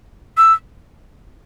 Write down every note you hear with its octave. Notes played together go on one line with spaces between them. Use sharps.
E6